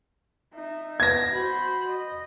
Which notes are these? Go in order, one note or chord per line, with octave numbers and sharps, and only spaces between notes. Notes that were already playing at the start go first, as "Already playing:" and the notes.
D#4 E5
B3 G#6 A#6
F#4 C5 B5
D#5